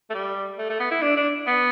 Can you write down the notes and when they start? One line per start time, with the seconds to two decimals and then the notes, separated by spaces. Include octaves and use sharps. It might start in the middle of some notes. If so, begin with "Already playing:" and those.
0.10 A3
0.14 G3
0.58 A3
0.69 A3
0.80 B3
0.91 E4
1.02 D4
1.17 D4
1.47 B3